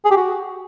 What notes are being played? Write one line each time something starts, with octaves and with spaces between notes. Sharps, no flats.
G#4
G4
F#4